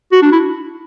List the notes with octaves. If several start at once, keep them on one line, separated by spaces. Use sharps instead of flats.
F#4
D4
E4